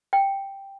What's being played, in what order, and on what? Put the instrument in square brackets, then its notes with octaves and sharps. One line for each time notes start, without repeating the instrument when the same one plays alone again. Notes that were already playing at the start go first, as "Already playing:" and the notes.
[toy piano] G5